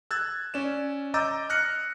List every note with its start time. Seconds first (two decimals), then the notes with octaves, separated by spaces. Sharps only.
0.11 E6 F#6 G#6 A6
0.54 C#4 D5 E7
1.14 D#5 A#5 D6 E6 G6 A6
1.49 D#6 F6 F#6 A#6 C#7